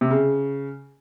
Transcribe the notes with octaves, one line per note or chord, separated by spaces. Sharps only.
C3
C#3